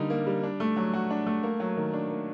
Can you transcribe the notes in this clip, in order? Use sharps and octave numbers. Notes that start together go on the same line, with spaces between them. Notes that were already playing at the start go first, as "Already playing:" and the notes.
Already playing: D3 G3 A#3 D#4
A#3
G3
D4
A3
F#3
F#4
D4
A3
A#3
F#3
D#3
D4
A#3